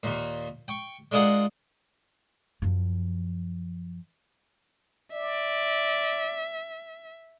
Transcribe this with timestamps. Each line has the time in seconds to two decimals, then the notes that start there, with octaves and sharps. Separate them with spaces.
0.03 D#2 A#2
0.68 G5 C#6
1.11 G#3 D4 F4 G#4 A#4 F#5
2.62 F#2 F3
5.13 D5 E5